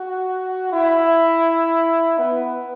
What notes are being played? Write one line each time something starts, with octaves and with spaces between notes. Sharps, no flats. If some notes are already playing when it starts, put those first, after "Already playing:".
Already playing: F#4
E4
B3